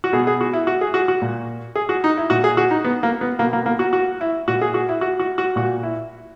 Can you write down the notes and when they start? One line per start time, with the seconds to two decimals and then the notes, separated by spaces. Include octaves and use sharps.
0.04 F#4
0.13 B2 G#4
0.27 G#4
0.41 F#4
0.53 E4
0.67 F#4
0.81 G#4
0.94 F#4
1.08 F#4
1.22 A#2
1.75 G#4
1.89 F#4
2.04 D#4
2.17 E4
2.30 A#2 F#4
2.44 G#4
2.57 F#4
2.71 D#4
2.85 B3
3.03 A#3
3.21 B3
3.39 B2 A#3
3.53 A#3
3.66 A#3
3.79 F#4
3.93 F#4
4.21 E4
4.48 A#2 F#4
4.61 G#4
4.74 F#4
4.89 E4
5.01 F#4
5.20 F#4
5.38 F#4
5.56 A#2 F#4
5.83 E4